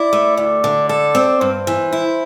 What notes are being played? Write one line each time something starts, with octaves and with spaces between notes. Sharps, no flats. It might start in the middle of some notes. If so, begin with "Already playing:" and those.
Already playing: E4 D5
A3
D2 D5
D3
A4 D5
C4
G2 C5
E3
E4